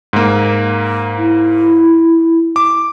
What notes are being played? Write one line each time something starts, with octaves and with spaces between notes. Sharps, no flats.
G#2 A#3
E4
D6